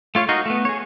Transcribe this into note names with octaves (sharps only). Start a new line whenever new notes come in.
A3 F4 C#5 F5
D#4 F#4 A#4 D#5 F5
A3 B3
G#4 C#5